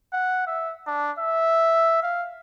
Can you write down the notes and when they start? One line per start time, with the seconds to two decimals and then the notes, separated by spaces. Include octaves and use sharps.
0.13 F#5
0.47 E5
0.87 D4
1.19 E5
2.03 F5